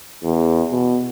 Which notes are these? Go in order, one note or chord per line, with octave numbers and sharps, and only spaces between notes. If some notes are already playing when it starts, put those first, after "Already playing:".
E2
B2